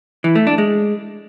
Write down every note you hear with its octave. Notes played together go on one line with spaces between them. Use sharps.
E3
A3
D4
G#3